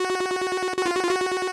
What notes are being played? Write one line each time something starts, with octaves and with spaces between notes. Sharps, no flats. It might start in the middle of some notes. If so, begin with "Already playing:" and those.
Already playing: F#4
F#4
F4
F#4
F4
F#4